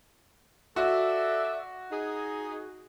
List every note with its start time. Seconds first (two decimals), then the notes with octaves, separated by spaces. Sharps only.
0.76 F#4 A4 D5 E5
1.90 D#4 G#4